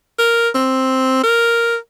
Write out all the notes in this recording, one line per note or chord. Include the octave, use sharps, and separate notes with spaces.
A#4
C4
A#4